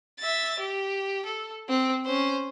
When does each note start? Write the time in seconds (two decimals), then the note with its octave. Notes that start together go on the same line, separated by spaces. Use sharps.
0.19 E5 A6
0.59 G4
1.25 A4
1.69 C4
2.05 C#4 C5